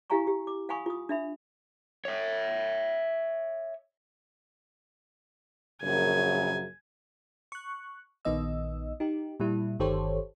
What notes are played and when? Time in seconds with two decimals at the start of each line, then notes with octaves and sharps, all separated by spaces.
0.10 E4 G4 F5 G#5 A#5 C#6
0.27 G4
0.47 D6
0.69 F5 F#5 G#5 B5 C#6 D#6
0.86 F4 D#6
1.09 D4 E5 B5
2.05 C#5 E5
5.83 A#1 F#2 C#3 G#5
7.52 C#6 F#6
8.25 A#1 D#3 B3 D#5 E6
9.00 D#4 G4
9.40 A#2 G3 E4
9.79 G1 D#3 G4 A4 C5 C#5